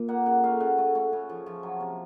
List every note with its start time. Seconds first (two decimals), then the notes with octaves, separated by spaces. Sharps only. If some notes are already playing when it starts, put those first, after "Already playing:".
Already playing: A#2
0.08 A#3 F#5
0.26 C#3 F#5
0.44 A3 F5
0.60 C#3 F#5
0.78 A3
0.95 A3
1.13 C#3
1.29 F3
1.46 F3
1.63 F#3
1.80 C3